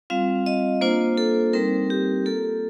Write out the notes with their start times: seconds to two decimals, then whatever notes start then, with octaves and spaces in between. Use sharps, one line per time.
0.10 G3 C4 F4 F5
0.46 D#5
0.81 A#3 D4 F4 C5
1.17 A4
1.53 G3 C4 D#4 A#4
1.90 G4
2.26 A#3 F4 A4